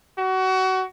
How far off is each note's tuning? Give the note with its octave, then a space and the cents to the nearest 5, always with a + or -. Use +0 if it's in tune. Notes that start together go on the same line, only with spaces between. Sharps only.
F#4 +25